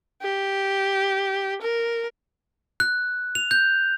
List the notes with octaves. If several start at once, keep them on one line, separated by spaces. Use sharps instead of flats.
G4
A#4
F#6
F7
G6